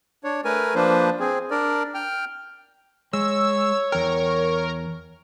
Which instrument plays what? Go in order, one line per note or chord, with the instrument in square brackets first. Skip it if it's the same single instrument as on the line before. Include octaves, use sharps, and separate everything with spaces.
[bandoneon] D4 C#5
A3 A#4 B4 G#5
F3 A#3 D4 B4 C5
C4 G#4
D4 A#4 D5
G5 F6
[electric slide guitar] G#3 [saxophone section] C#5 [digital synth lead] E6
[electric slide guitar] E2 G5 [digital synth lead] A#4